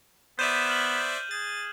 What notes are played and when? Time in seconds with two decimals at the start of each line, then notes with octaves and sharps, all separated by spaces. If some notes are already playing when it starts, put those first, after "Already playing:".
0.39 B3 C5 D5 E5 G6 D#7 E7
0.69 F6 F#7
1.31 G#4 A6